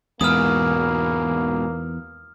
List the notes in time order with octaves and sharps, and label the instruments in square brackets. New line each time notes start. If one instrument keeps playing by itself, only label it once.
[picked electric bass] E2 [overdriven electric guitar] G#2 B2 [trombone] A#3 [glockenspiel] D#6 F6